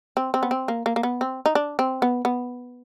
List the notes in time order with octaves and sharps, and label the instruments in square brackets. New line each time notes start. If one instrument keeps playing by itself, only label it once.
[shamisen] C4
C4
B3
C4
A#3
A#3
A#3
B3
C4
D#4
D4
C4
B3
B3